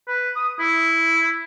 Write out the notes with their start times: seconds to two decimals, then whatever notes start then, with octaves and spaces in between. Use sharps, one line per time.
0.08 B4
0.36 D#6
0.60 E4